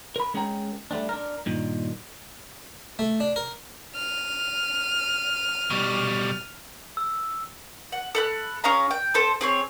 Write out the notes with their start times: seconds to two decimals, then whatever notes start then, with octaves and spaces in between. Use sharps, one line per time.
0.16 A#4 B5
0.34 G#3 C#4 G#4 A#4 G5 A#5
0.91 G3 A3 C4 D4
1.09 D4 A#4
1.46 G2 A#2 D#3
2.99 A3
3.20 D4
3.36 A#4
3.96 F6 D#7
5.70 B2 G3
6.97 E6
7.92 F#5
8.15 A4 B5 F#6
8.64 C#4 G#4 F5 A#5
8.91 G5
9.14 C4 A4 C5
9.41 C4 G#4 C#5